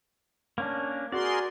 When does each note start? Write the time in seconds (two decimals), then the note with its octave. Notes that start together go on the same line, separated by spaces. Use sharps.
0.58 A#3 C#4 D4
1.12 F#4 G#4 A#4 D5 C6